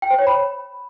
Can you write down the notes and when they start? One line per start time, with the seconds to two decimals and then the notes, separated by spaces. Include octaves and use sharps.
0.02 G5
0.10 C5
0.19 C#5
0.27 B5